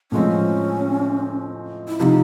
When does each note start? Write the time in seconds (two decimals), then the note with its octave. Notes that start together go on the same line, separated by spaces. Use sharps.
0.12 A2 F3 G#3 C4 C#4
1.88 E4
1.99 C3 F3 D#4 E4